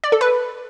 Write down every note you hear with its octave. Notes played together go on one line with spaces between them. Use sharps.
D5
A4
B4